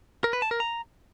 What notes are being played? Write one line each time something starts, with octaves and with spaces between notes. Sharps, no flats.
A#4
B4
A5
A#4
A#5